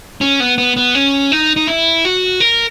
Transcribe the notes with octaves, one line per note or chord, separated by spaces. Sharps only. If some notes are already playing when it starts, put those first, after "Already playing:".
C#4
B3
B3
B3
C#4
D#4
D#4
E4
F#4
A#4